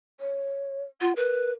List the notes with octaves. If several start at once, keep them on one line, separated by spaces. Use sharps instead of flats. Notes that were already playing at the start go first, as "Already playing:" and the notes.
C#5
F4 F#5
A#4 B4